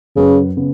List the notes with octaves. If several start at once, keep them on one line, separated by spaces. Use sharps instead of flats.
F#2 C#3 F#3 C#4 B4
C#3 B3